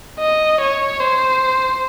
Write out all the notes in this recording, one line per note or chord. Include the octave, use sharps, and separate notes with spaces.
D#5
C#5
C5